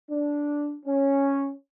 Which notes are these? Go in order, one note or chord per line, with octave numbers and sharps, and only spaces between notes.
D4
C#4